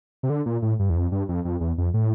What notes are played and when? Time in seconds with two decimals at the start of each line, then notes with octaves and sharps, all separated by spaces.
0.23 C3
0.30 D3
0.46 A#2
0.62 A2
0.79 G2
0.90 E2
0.96 F2
1.12 G2
1.29 F2
1.45 F2
1.61 E2
1.78 F2
1.94 A2